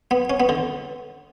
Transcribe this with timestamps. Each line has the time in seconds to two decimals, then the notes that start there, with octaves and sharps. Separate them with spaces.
0.11 B3
0.30 C#4
0.40 B3
0.49 D3